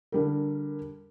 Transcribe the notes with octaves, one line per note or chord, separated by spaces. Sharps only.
D3 G3 A#4